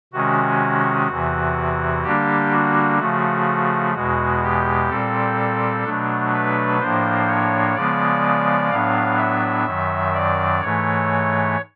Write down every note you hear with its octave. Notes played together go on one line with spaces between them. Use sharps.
C3 D#3 G#3 C#4 F#4
E2 C3 E3
D3 G3 A#3 D4 G4
F#4
C#3 F3 A3 F#4
E2 B2 G#3 F#4
G4
A#2 G3 C4 A4
B2 F#3 A3 D4
B4
A2 F3 A#3 D4 C5
C#5
C#3 F3 G#3 B3 D5
A2 F#3 B3 D4 F5
E5
F#2 D#3 F#3
D5
G#2 E3 A3 C#5